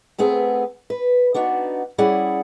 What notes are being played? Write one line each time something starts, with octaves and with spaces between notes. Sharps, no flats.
A3 B3 C4 G#4
B4
B3 D4 D#4 F#4
G3 C#4 E4 G#4 D5 F#5